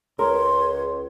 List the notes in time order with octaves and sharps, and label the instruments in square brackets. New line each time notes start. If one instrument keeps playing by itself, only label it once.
[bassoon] C#2 [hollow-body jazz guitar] A#4 [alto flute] C#5 [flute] C6